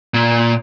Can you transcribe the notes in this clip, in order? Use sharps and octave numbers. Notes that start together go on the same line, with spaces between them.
A#2